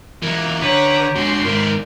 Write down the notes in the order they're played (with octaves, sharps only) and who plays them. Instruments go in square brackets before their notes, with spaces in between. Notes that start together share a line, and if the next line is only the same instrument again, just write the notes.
[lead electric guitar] E3 F#3 [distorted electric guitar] A#3
[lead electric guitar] D3 [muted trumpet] G4 [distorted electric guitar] B4 [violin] C#5 A#5
[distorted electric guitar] D3 G#3 [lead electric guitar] F#4 [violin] C6
[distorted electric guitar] G#2 D#3 [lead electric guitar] A#4 B4